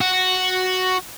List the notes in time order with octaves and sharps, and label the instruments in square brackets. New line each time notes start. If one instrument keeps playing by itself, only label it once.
[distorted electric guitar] F#4